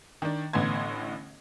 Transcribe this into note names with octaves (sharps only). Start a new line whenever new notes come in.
D#3 D4
A1 A2 D3 B3 C6 G#6